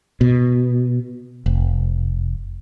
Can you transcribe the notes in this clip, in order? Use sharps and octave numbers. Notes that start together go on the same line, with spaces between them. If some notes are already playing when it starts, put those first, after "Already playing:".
B2
F1